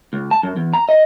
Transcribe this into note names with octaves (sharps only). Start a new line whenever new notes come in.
C#2
A5
F#2
E2
A#5
D#5